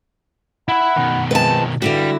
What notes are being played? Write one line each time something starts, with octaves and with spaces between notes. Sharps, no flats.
E4 E5 F#5 B5
B2 D#3
F3 G#3 C4 B4 A5
G2 D3 G3 E4 F#4